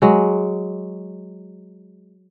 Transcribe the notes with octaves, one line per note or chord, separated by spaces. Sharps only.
F#3 G#3